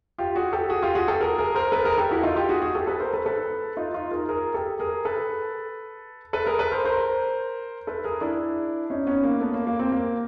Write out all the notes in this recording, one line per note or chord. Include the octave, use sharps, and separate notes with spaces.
F4 G4
F#4 G#4
G4 A4
F#4 G#4
F4 G4
F#4 G#4
G4 A4
G#4 A#4
G#4 A#4
A#4 C5
A4 B4
G#4 A#4
G4 A4
E4 F#4
D#4 F4
F4 G4
F#4 G#4
F#4 G#4
G4 A4
A4 B4
A#4 C5
A4 B4
A4 B4
D#4 F4
D#4 F4
G#4 A#4
G#4 A#4
G4 A4
G#4 A#4
A4 B4
A4 B4
G#4 A#4
A4 B4
A#4 C5
A#4 C5
A4 B4
G#4 A#4
D4 E4
C#4 D#4
B3 C#4
A#3
A3 B3
A#3
A#3
A#3 C4
A#3